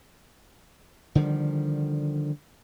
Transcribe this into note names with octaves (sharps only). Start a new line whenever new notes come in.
D3 D#3 F3 G3